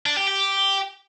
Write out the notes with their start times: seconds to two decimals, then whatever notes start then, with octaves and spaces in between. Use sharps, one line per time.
0.06 D4
0.17 G4
0.27 G4